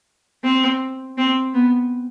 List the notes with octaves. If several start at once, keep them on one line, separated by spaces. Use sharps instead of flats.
C4
C4
B3